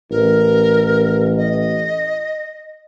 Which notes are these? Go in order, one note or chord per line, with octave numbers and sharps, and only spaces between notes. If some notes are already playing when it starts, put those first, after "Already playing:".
A1 A#4
D#5